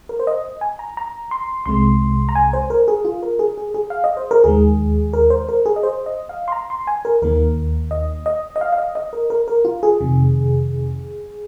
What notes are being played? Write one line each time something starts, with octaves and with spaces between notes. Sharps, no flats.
A#4
C5
D#5
G#5
A#5
A#5
C6
C2 C3 G#3 C6
A#5
G#5
C5
A#4
G#4
F4
A#4
G#4
G#4
G#4
F5
D#5
C5
A#4
D#2 D#3 G#3 G#4
A#4
C5
A#4
G#4
D#5
C5
D#5
F5
C6
A#5
C6
G#5
A#4
D#2 D#3 A#3 A#4
D#5
D#5
D#5
F5
F5
D#5
D#5
A#4
A#4
A#4
F4
G#4
F2 C3 D#3